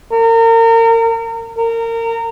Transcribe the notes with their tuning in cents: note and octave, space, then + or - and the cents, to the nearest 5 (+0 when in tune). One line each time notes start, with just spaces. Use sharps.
A#4 -35
A#4 -25